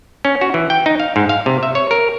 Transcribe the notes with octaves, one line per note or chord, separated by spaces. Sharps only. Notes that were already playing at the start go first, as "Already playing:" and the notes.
C#4
F#4
E3
G5
D#4
F5
G#2
F5
C3
E5
C#5
A#4